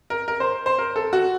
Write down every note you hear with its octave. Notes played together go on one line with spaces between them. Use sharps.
A#4
A#4
C5
C5
A#4
A4
F#4